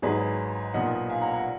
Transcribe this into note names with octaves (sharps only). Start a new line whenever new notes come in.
G#1 G#2 F#3 G#4 B4
B1 A#2 F3 B3 D#5 F#5
F5 G#5
F#5 A#5
F#5 A#5